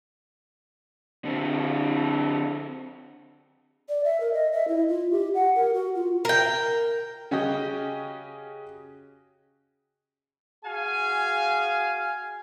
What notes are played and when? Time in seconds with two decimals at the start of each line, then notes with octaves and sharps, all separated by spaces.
1.25 D3 C4
3.89 D5
4.04 E5
4.20 A#4
4.33 D#5
4.52 E5
4.68 E4
4.87 F4
5.11 G4
5.34 F#5
5.55 A#4
5.74 F#4
5.95 F4
6.25 A#4 G5
7.31 C#3 C#4 F#4 G4 D#5
10.64 F#4 G#4 F5 G#5